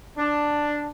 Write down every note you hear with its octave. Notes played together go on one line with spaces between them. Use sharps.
D4